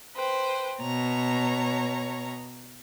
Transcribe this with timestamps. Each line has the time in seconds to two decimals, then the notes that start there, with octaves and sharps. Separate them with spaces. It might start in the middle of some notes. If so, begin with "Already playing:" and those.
0.16 B4 C5 G5
0.79 B2 C#5 A#5